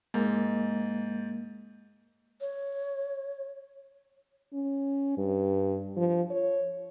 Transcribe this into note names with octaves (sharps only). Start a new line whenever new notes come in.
G#2 G#3 A#3
C#5
C#4
G2
F3
C#5